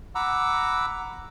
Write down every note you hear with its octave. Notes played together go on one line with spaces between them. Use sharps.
F#5 A#5 B5 D6 E6